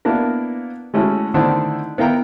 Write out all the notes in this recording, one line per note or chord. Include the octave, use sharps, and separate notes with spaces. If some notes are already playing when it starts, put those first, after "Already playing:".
A#3 B3 D4 E4 A#4
G#3 A3 C#4 E4 F#4
D3 D#3 A3 C4 D4 E4
B3 E4 A#4 F5 G5 A#5